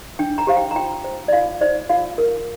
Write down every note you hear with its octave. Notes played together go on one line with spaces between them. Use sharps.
D4 G5
A#5
G4 C5 F5
G5
A#5
F4 G5
C5
D5
F4 F5
C5 D5
F4 F5
A#4